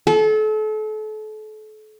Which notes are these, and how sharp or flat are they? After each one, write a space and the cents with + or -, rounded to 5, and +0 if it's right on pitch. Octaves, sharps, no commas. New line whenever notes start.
A4 -35